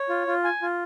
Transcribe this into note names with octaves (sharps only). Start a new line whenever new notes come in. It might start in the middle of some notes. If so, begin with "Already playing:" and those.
Already playing: C#5
F4
F4
G#5
F4